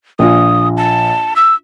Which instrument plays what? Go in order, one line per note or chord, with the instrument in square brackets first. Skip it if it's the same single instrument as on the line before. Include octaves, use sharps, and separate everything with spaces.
[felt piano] A#1 F4 [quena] D#6
[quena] A5
E6